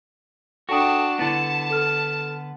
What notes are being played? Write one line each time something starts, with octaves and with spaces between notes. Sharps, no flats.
D4 F#4 A4 G5 A5 D#6
D3 B3 E4 A5 A6
A4 F6